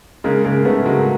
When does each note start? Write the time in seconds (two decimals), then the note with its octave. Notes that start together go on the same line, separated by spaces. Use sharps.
0.24 C#3 G#3 A#3
0.45 C#3 G#3 A#3
0.65 C#3 A3 B3
0.86 F#3 G#3 A#3